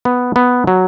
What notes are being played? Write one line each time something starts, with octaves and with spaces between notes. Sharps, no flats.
B3
B3
F#3